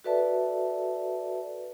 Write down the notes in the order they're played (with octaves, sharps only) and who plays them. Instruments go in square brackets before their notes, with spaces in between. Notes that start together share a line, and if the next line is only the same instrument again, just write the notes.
[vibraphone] F#4 A4 B4 D5 E5 A5